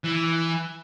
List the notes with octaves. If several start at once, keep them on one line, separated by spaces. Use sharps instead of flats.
E3